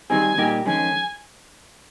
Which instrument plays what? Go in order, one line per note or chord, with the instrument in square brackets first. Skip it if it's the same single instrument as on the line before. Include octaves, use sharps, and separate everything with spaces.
[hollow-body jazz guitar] D#3 G3 C4 D#4 G#4 [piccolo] G#5
[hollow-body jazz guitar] A#2 G3 A#3 D#4 G4
[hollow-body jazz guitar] F2 D#3 G#3 C#4 [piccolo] G#5